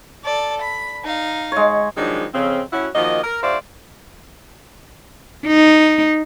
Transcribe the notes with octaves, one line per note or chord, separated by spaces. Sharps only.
A4 D5
B5
D#4 F5
G#3 C#5
D#3 F3 F#3 G#3 D4 D#4
F2 C#3 C4
A2 C#4 E4 F#4
D#3 F3 A#3 F#4 D#5
A#4
G#2 F#4 C5 D5 E5 F5
D#4